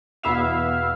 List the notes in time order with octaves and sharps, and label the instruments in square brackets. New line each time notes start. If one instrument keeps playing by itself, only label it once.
[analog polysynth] E2 B2 B3 E4 E5 F5